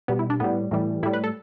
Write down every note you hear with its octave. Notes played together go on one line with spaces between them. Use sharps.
B2 G3 B3
E4
D4
A2 G3 B3
A2 E3 G3
A2 G3 E4
B4
A4